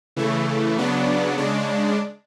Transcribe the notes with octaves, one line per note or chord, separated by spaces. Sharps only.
C#3 E3 A3
C#3 F#3 B3 D4
C#3 G#3 D4